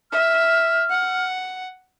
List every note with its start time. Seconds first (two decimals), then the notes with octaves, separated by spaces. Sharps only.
0.12 E5 F6
0.90 F#5